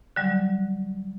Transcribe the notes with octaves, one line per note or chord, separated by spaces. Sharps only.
D3 F#3 G3